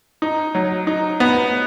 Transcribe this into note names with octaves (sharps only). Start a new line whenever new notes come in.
D#4
F#3
D#4
B3